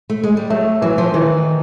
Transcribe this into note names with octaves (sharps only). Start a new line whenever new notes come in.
A3
G#3
G3
F#3 A3
E3 F#3
F3
D#3 E3